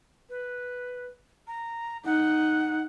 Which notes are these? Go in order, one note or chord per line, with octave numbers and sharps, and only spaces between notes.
B4
A#5
D#4 F#5